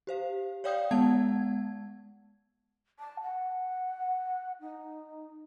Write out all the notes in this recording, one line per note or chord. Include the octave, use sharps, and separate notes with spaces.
G4 C5 F5
C#5 D5 F5 G5 D#6 G6
G#3 B3 F#5 A5 G#6
A5
F#5
D#4